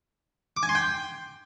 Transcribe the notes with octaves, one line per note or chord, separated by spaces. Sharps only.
D6
G#5
C6
G5